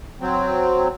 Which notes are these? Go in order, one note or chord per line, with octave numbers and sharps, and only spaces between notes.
F#3 C4